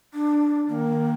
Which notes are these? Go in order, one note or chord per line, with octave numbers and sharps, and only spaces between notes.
D4
D#3 A#3